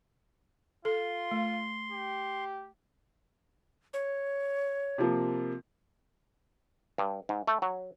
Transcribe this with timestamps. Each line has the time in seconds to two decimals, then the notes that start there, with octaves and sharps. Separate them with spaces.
0.85 F4 A4 C6
1.31 A3
1.92 G4
3.94 C#5
4.98 C3 F3 A#3
6.98 G2
7.29 G#2
7.47 A3
7.62 F#3